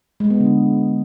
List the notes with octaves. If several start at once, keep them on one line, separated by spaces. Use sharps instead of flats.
G#3
B3
D3